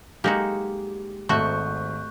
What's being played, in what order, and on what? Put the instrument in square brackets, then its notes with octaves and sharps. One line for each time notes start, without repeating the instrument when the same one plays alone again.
[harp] G#3 G4 [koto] A#3 D#4 F#4
[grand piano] G#1 G#2 [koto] A3 F#4 [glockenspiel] C#6 F#6 G6